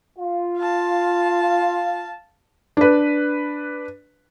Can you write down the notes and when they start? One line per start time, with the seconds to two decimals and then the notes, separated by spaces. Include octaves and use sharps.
0.19 F4
0.57 F5 A5
2.77 D4 B4